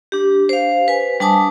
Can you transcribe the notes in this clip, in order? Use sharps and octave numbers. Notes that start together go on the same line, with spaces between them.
D4 G4
C5 F5
B4 G#5
G3 D4 G#5 A5 D6 D#6